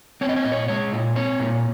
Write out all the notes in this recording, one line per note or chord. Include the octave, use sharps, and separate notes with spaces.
C4 C#5
D#5
C#5
A#2 D#5
C#5
G#3 C#5
A#2
C4 C#5
A#2